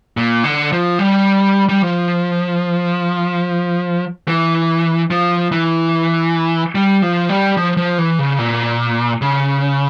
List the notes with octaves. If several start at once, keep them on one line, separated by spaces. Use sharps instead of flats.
A#2
D3
F3
G3
G3
F3
E3
F3
E3
G3
F3
G3
F3
F3
E3
C#3
A#2
C#3